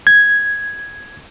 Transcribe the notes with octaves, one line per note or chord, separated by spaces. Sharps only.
G#6